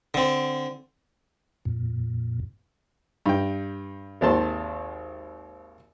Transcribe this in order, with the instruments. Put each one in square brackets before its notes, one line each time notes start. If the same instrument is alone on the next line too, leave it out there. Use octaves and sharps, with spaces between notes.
[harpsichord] D3 C4
[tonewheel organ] F2 A#2
[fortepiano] G2 G5
G#1 D#2 C4 A4 A5 C6